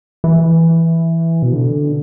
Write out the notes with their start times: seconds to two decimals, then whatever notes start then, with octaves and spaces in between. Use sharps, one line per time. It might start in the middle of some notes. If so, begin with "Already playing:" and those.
0.24 E3
1.42 B2
1.53 D3